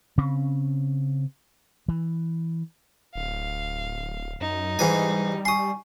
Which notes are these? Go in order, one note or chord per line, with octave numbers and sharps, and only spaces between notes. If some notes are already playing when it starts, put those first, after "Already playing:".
C#3 C4 C#4
E3
D1 F5
F#2 D#4
G#2 E3 G3 G#5
G#5 C6 C#6 D#6